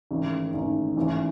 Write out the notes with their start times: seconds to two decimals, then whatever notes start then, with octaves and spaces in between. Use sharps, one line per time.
0.11 A1 G#2 D#3
0.53 A1 G#2 D#3
0.97 A1 G#2 E3